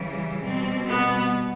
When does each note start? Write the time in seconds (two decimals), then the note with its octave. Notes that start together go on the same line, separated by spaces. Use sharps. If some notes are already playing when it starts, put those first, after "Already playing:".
Already playing: C#3 E3 G3
0.42 B2 G3 C4
0.87 B3